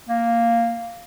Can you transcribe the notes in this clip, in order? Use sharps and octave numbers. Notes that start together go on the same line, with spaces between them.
A#3